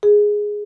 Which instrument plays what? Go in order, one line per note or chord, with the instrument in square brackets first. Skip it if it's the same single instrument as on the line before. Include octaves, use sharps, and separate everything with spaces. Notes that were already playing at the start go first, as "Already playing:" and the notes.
[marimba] G#4